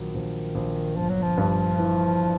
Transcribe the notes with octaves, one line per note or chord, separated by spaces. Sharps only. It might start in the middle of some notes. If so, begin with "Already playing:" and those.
Already playing: A#1 D#3 F#3
A#1
A#1
G1 F3
F#3
F3
G2
E3